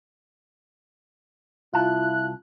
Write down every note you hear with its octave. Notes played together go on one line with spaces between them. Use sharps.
C2 E4 F4 A5 F#6